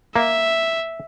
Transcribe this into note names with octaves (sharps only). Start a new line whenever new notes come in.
A#3 E5